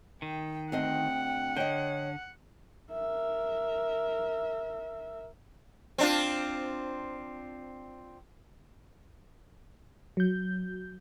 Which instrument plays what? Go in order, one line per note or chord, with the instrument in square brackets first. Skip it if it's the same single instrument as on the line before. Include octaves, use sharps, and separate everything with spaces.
[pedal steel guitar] D#3 [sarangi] G5
[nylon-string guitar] D2 C4 D#5 [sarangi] F#5 [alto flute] G5
[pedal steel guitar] D3 [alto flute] C#5 [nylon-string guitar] D#5 G5
[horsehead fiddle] A#4 E5
[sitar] C4 D4 F4
[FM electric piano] F#3 G6